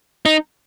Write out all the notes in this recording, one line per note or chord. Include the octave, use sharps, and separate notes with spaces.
D#4